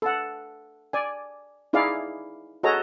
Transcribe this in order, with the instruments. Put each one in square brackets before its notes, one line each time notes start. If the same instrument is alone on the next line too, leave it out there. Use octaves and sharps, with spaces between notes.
[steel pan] A4 F#5
D5 G#5
D#4 E4 G#4 D5 F5
F#4 G#4 A4 C#5 D#5 A#5